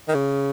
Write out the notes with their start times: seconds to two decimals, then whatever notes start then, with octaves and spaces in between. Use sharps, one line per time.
0.08 D#3
0.14 C#3